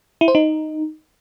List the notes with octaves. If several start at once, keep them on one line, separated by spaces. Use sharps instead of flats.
E4
C5
D#4